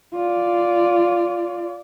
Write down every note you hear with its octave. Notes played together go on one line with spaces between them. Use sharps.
F4 D5